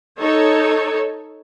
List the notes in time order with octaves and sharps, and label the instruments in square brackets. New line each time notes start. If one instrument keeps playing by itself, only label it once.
[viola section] D#4 A4 C#5